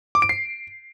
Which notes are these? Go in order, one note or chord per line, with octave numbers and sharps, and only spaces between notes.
D6
D7
C7